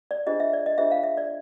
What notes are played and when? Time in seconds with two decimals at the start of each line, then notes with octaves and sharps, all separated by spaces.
0.11 D5
0.27 D4 F4 G#4 C5 D#5
0.40 E5
0.53 D5
0.66 D#5
0.78 D4 F4 G#4 C5 E5
0.91 F5
1.04 E5
1.17 D5